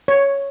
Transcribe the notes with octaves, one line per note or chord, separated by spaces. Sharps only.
C#5